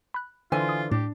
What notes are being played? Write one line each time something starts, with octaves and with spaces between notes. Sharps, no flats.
B5 F#6
D3 E3 F4 C5 G#5
D#6
A2 D4 G4